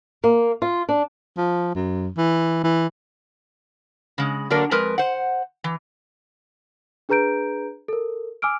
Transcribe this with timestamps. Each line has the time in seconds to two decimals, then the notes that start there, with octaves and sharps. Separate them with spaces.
0.24 A#3
0.62 F4
0.89 D4
1.37 F3
1.75 F#2
2.17 E3
2.64 E3
4.18 C#3 G#3
4.50 D3 F#3 A#3 D4 A#4
4.71 F2 G#3 A#4 B4
4.98 C5 F#5
5.64 E3
7.09 D4 G#4 B4 A#5 G6 D7
7.88 A4 A#4
8.42 G#5 D6 E6 F6 D7